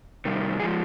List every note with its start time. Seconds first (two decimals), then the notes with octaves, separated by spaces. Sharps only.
0.25 C3 D#3 G3
0.60 G#4
0.62 F3 G#3